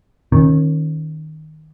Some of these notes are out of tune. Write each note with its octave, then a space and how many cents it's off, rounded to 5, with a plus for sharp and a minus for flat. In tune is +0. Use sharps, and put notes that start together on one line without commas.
D#3 +0 C#4 -25